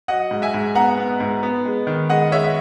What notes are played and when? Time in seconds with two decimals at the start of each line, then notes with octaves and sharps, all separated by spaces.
0.08 F#3 D#5 F#5
0.31 G#2
0.42 E5 G#5
0.54 G#2
0.75 B3 F#5 A#5
0.98 B3
1.20 G#2
1.43 B3
1.65 G#3
1.87 D#3
2.10 G#3 D#5 F#5
2.32 G#3 C#5 E5
2.44 E5